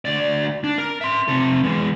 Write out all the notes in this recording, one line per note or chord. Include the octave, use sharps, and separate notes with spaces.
D2 D5
D4
A#4
E5 C6
C3 A4
E2 G#3